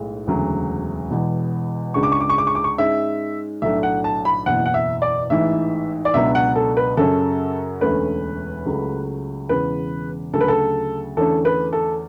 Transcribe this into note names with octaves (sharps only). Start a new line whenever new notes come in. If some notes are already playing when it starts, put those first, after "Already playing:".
Already playing: B1 A2 G#3
E1 D2 C#3 F#3
E1 E2 B2
C#2 C#3 G#3 D4 C#6
D6
C#6
D6
C#6
D6
C#6
D6
C#6
G#2 G#3 C#4 E5
B1 A2 F#3 A3 D4 E5
F#5
A5
B5
F#1 E2 B2 F#5
F#5
E5
D5
A1 G#2 E3 E5
D5
C#2 B2 F#3 B3 D4 E5
F#5
A4
B4
F#2 C#3 F#3 C#4 A4
E1 D2 D3 A3 C#4 B4
C#2 C#3 F#3 A3
E1 E2 C#3 B4
D2 C#3 F#3 A4
B4
A4
E2 D3 A3 C#4 A4
B4
A4